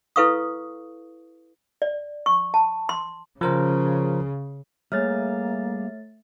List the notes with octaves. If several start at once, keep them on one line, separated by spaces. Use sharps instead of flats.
E4 A4 B4 F5 C#6 D#6
D5
C#6
A5
C6
C#3 F3 A#4 C5
G3 A3 A#3 G#4 C#5 F6 A6